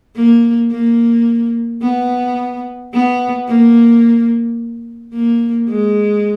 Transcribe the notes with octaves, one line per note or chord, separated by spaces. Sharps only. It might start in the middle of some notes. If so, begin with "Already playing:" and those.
A#3
A#3
B3
B3
A#3
A#3
G#3